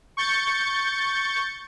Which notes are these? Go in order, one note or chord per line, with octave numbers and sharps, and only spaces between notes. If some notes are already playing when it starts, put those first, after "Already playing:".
C#6 G6 A6 C#7